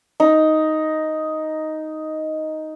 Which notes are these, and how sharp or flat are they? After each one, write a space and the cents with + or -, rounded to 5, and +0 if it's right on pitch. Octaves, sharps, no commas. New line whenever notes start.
D#4 +5